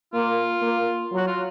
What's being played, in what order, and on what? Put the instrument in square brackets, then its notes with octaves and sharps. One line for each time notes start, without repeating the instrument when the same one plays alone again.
[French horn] A#3 [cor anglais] F4
[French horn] A#3
F#3
[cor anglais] F#4
F4